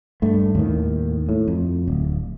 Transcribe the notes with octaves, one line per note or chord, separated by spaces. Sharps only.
G2 A3
D#2 A2 D#3
A2
F2
D1